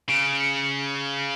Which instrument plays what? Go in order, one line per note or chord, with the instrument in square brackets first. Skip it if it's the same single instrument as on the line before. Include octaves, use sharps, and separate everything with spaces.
[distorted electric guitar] C#3 [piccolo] D7
[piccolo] C#7